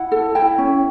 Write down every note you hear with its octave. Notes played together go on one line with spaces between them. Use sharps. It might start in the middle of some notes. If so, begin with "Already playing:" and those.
Already playing: E4 F#5
A4
E4 G5
C#4